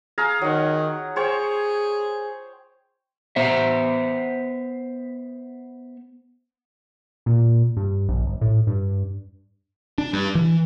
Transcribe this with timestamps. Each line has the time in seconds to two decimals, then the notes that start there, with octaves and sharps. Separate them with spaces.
0.18 G#4 F5 A#5
0.41 D#3 F#3 F#5
1.16 G#4 C5 C#5 G5
3.36 B3 C5 E5
7.26 A#2
7.77 G2
8.09 A#1
8.26 G1
8.41 A2
8.67 G2
9.98 D4
10.13 G2
10.35 E3